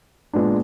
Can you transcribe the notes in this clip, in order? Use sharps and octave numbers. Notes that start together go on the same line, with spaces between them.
A#2 G#3 B3 D4